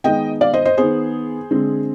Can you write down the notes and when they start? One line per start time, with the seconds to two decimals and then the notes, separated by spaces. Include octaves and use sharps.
0.04 D#3 G#3 B3 D#5 G5
0.41 D5 F5
0.54 C5 D#5
0.65 C5 D#5
0.77 D#3 B3 G#4 C5
1.51 D3 G#3 C4